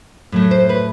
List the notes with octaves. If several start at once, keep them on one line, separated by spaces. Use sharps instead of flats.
A2 F#3 A3
C5
B4